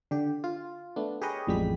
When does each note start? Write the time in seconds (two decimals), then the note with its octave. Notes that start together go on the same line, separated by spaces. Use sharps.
0.11 D3 G4
0.44 F4
0.96 A3 B3 D4
1.22 G4 G#4 A#4 B4 C#5 D#5
1.47 A1 F2 G3 G#3 G4 B6